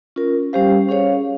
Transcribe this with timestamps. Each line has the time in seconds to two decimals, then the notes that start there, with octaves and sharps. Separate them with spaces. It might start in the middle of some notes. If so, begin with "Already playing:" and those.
0.16 C#4 F4 A#4
0.53 G3 C#4 G4 C5 F5
0.89 C#4 G#4 C#5 F5